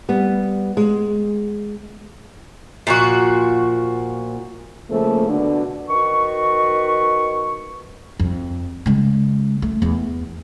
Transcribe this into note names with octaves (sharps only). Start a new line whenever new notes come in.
G3 B3
G#3
A#2 F3 F#4
C#3 F3 A3 A#3 A4
B2 D3 D4
D#3 F#4 B4 C#6
F2
C#3 G#3
A3
E2